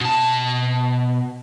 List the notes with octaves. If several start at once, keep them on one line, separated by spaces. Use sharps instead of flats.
B2 A5